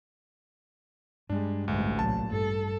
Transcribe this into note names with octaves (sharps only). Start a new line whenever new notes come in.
G2 G3 G#3 D4
A1 D2 G#3
C2 A#2 F#3 A5
G2 A4